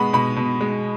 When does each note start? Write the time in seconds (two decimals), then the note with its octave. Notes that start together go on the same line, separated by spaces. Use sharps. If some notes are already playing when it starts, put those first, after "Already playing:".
Already playing: B2 G#3 B3 B5 C#6
0.13 B2 B5
0.36 B2
0.61 G#3